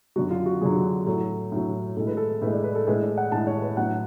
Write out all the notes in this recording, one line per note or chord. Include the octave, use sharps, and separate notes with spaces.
F#2 D3 F#3 F#4
F4
F#4
F#2 D3 F#3 G#4
F#4
A2 F#3 A4
A2 F#3
A2 G#3 A4
B4
A4
A2 G#3 B4
D5
B4
A4
A2 G#3 B4
D5
F#5
A2 G#3 A5
C#5
B4
A2 F#3 F#5